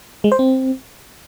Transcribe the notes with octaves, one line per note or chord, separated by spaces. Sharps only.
G#3
C5
C4